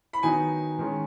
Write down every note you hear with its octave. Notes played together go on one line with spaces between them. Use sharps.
B5
D#3 F#3 B3 D#4 G#5
D#3 G#3 C#4